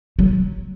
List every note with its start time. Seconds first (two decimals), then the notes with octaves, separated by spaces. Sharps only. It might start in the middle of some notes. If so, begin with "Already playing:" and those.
0.19 F#3